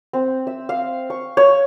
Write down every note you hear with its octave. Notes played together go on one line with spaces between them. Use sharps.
C4
E5
F5
C#6
C#5